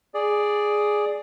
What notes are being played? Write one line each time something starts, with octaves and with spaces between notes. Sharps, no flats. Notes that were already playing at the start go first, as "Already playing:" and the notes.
G#4 D5